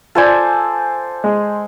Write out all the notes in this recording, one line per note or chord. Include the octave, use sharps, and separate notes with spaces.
F4 A4 C5 D5 G#5
G#3